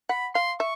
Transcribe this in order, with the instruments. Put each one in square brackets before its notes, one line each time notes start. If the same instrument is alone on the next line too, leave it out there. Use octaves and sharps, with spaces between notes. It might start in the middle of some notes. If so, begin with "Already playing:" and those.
[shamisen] F#5 [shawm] B5
[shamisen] F5 [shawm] C6
[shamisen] E5 [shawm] C#6